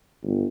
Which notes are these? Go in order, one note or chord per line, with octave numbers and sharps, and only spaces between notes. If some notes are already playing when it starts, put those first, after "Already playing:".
G1